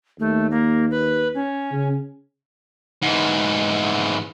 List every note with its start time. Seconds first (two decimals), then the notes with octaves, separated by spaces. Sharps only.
0.20 D#2 A3
0.51 A#3
0.91 B4
1.34 C#4
1.71 C#3
3.03 G#2 E3